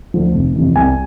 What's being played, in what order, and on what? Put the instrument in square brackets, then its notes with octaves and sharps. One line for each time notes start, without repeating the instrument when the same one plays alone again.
[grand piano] D2 D3 F3
F1
F2 C3 E3
C2 G#5